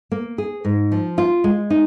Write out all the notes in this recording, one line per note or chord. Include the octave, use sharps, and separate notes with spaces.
A#3
G#4
G#2
F3
F4
G#3
D#4